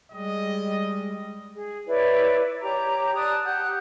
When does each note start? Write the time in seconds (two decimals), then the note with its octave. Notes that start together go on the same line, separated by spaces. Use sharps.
0.12 G3 G#3 D#5
1.54 G#4
1.87 E4 B4 C#5 D5
2.62 G4 C#5 A#5 D6
3.16 D5 A5 D#6 F#6
3.45 G4 F#5 F#6 G6